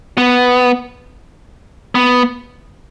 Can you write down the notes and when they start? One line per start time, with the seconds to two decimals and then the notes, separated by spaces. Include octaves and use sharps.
0.18 B3
1.95 B3